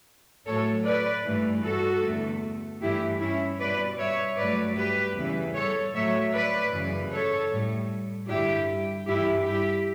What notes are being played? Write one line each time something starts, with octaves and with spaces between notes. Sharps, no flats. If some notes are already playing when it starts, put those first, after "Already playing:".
A2 F#3 A3 A4 C#5
B4 D5
G2 E3 A3
F#4 A4
E2 D3 A3
G2 E3 A3 E4 G4
C#4 E4
B2 G3 B4 D5
C#5 E5
G2 F#3 A3 B4 D5
G4 B4
E2 C#3 E3 G3
A4 C#5
A2 F#3 A3 C#5 E5
B4 D5
F#2 C#3 E3 G3
A4 C#5
A2 G3
G2 D3 G3 E4 G4
G2 E3 G3 E4 G4
E4 G4